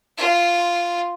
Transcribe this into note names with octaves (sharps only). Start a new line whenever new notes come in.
F4